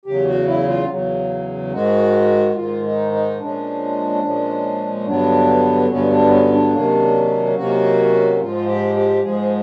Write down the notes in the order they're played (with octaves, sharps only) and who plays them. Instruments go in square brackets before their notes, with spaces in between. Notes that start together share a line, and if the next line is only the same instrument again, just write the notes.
[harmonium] E2 C#3 F#3 G4
F#4
E4
F4
E2 C#3 F#3
G#2 D#3 G#3 F#4
G#2 D#3 G#3 F4
D#4
D#4
A#2 F3 G#3 C#4 D4
A#2 F3 G#3 C#4
G2 D3 F#3 B3 D4
G2 D3 F#3 B3 C#4
D4
C#4
D4
C3 D#3 F#3 A#3 C#4
C3 D#3 F#3 A#3 C#4 F#4
G#2 F3 G#3 F4
G4
G4
G#2 F3 G#3 G#4